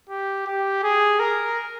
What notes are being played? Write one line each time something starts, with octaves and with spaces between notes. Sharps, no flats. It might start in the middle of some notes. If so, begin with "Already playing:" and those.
G4
G4
G#4
A#4